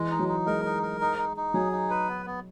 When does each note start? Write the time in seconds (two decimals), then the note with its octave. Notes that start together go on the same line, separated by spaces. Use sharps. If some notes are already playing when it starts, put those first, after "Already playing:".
Already playing: E3 G#3
0.11 D#4
0.19 F#3
0.28 D#4
0.46 G#3 A#4
0.65 D#4
0.82 A#4
1.01 D#4
1.18 D#4
1.37 D#4
1.54 F#3 G#4
1.72 D#4
1.90 B4
2.08 B3
2.26 B3